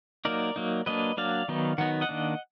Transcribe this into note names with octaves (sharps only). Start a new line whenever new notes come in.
F#3 A#3 D#4 A#4 D5
F#3 A#3 D#4
F#3 A#3 D4 B4 D#5
F#3 A#3 D4 D5 F5
D#3 F#3 B3 D#4
D#3 F#3 B3 D#4 F#5
D#5 F#5
D#3 A#3 D4